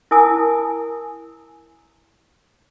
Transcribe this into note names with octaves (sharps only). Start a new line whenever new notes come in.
E4 A#4 G#5 A5 D#6